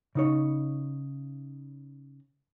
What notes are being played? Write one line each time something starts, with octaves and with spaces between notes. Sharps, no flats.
C#3 D#4 C#5